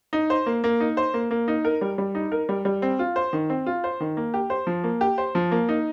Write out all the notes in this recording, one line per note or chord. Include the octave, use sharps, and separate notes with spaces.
D#4
C5
A#3
A#3
D#4
C5
A#3
A#3
D#4
A#4
G3
G3
D#4
A#4
G3
G3
C4
F4
C5
D#3
C4
F4
C5
D#3
A#3
G4
C5
F3
A#3
G4
C5
F3
A#3
D#4